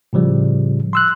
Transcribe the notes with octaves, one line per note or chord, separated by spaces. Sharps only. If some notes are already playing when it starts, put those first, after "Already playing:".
A2 C#3 F3 G3
C6 E6 F#6